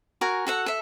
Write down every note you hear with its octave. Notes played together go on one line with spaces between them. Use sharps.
F#4 A#4 G#5
F#4 A4 F#5
A4 E5